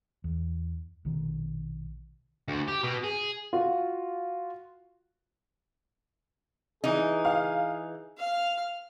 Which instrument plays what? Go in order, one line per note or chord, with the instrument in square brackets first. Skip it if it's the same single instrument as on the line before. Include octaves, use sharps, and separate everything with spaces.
[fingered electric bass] E2
A#1 B2 D#3
[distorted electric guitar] D2
G4
B2
G#4
[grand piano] F4 F#4
[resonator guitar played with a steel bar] E3 D#4 [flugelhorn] G#4
[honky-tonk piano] F5
[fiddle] F5 F6